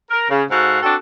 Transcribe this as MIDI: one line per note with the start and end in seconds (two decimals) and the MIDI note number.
0.11 0.26 70
0.29 0.43 49
0.50 0.79 44
0.50 0.79 66
0.50 0.79 69
0.50 0.79 77
0.83 0.95 60
0.83 0.95 62
0.83 0.95 66
0.83 0.95 69